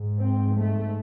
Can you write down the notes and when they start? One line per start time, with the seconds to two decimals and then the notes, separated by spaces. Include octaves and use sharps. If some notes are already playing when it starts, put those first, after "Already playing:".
Already playing: G#2
0.19 C4
0.56 A3